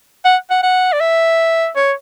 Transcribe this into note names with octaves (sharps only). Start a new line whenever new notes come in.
F#5
F#5
F#5
D5
E5
C#5